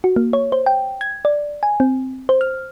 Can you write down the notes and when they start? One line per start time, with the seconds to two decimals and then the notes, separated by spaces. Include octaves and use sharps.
0.04 F#4
0.16 A#3
0.33 C#5
0.52 C5
0.66 G5
1.01 G#6
1.25 D5
1.63 G#5
1.80 C4
2.29 C5
2.41 F6